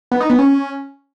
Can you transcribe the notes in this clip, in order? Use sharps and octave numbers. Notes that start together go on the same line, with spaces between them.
B3
D#4
B3
C#4